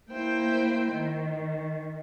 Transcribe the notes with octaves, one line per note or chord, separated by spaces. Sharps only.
A#3 E4 C5 G5
D#3